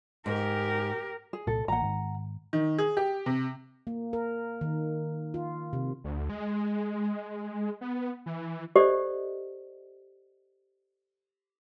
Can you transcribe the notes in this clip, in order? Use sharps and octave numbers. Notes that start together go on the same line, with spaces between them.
G#2 G4 A#4
G#4
C2 A#2 A4
A1 A#3 F#5 A#5
G#2 D#3
D#3
G#4
G4
C3
A#3
A#4
D#3
F4
C3
D2
G#3
B3
E3
G4 A4 C5 D5 D#5